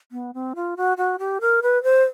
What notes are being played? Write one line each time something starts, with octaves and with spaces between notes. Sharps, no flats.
B3
C4
F4
F#4
F#4
G4
A#4
B4
C5